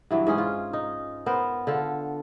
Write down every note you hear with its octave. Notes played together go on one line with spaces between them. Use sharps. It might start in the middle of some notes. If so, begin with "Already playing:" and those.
G2 E3 F#3
G#2 C#4 G#4 F#5
F4
D#4
B3 A#4 C5
D3 F4 A4